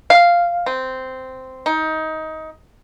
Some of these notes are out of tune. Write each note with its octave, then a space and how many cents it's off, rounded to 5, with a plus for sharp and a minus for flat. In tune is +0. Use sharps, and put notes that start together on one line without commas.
F5 -5
C4 -10
D#4 +20